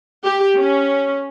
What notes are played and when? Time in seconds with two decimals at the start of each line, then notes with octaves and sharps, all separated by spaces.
0.25 G4
0.58 C#4